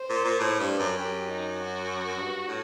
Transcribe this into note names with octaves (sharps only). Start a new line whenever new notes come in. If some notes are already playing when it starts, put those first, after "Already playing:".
Already playing: C5
A#2
A#2
A2
G2
F#2
F#2 G4
D#4
F#4
G2
A2